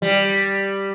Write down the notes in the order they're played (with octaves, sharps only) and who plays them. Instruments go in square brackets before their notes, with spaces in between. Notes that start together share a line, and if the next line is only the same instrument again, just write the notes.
[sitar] G3